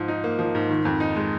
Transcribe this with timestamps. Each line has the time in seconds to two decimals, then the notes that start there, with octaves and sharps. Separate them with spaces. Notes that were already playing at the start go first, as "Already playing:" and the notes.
Already playing: G#2 F3
0.08 D#4
0.24 A#3
0.39 F3
0.55 G#2
0.69 D#3
0.85 F2
1.00 D#4
1.16 G#3